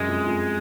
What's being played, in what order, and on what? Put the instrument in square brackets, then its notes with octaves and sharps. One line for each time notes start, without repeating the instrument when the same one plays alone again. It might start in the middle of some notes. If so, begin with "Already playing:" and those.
Already playing: [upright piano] F#2 [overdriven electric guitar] G#3
[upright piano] F2
F2